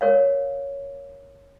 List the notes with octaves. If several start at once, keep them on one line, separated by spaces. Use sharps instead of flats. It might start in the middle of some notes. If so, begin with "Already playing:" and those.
A#4 C#5 F5